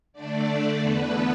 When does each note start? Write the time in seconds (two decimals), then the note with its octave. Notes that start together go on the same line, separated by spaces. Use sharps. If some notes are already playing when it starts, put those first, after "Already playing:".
0.13 D3 A3 D4 D5
0.79 E2 D3 B3 B4